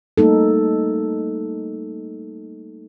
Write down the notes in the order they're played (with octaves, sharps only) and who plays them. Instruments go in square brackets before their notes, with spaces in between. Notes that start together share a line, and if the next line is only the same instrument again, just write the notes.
[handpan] G3 A3 A#3 D#4 A4